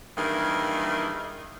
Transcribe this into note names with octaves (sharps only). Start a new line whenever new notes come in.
G2 D#3 E3 G#3 A#3